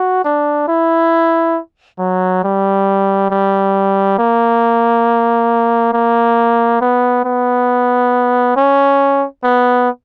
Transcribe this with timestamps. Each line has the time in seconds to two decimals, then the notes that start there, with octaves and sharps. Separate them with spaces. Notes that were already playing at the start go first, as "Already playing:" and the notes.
Already playing: F#4
0.25 D4
0.68 E4
1.99 F#3
2.44 G3
3.31 G3
4.19 A#3
5.93 A#3
6.81 B3
7.25 B3
8.57 C#4
9.44 B3